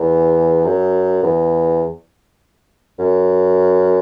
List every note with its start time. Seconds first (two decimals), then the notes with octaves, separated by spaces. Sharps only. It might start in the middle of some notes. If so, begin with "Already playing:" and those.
Already playing: E2
0.65 F#2
1.23 E2
2.99 F#2